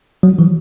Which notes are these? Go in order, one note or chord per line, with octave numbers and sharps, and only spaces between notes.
F#3
E3